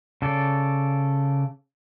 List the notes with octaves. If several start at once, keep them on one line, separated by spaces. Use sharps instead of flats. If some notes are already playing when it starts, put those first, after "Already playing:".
C#3 A4 D5